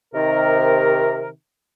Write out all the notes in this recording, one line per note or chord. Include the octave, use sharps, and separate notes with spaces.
C3 D#3 A#4